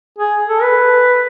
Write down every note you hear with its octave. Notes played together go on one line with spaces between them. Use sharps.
G#4
A4
B4